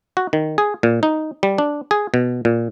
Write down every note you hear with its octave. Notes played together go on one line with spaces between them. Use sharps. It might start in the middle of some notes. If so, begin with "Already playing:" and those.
F#4
D#3
G#4
A#2
D#4
G3
D4
G#4
B2
A#2